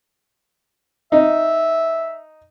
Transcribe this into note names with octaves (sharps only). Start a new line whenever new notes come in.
D#4 E5